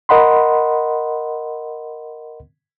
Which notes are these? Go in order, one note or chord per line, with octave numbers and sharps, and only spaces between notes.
A#4 D#5 F#5 B5 C6